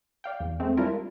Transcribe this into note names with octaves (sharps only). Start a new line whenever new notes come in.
D5 F5 G5
E2
G#3 A3 C4
G3 D4 E4 F4 A#4